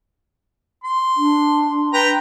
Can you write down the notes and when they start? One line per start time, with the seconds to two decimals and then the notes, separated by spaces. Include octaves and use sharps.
0.84 C6
1.17 D4
1.93 B4 G5 A#5